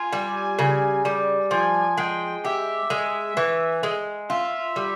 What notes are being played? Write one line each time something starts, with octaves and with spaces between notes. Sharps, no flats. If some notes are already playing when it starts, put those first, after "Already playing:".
Already playing: F4 G#5
G3
C#3
G3
F3 G#5
G#3 G5
G4 E5
G#3
E3
G#3
F4 E5
G3